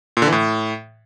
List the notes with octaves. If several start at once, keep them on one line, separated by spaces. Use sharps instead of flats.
A#2
D3
E3
A2